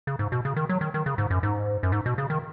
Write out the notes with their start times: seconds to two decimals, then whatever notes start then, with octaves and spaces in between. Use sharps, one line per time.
0.07 C#3
0.19 G#2
0.32 B2
0.45 C#3
0.56 D#3
0.69 F#3
0.81 D#3
0.94 D#3
1.06 C#3
1.18 G#2
1.30 F#2
1.43 G#2
1.83 F#2
1.92 G#2
2.06 B2
2.18 C#3
2.30 D#3